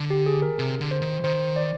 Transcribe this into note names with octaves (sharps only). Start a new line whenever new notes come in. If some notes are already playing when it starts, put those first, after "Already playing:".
Already playing: D3
G4
G#4
A#4
C3
D3
C5
D#3
D#3 C5
D5